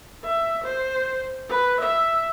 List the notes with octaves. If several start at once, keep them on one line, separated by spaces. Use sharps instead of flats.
E5
C5
B4
E5